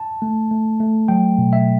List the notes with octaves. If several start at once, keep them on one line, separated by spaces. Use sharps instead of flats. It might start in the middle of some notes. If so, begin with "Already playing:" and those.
Already playing: A5
A3
A3
A3
F#3 G5
B2
E5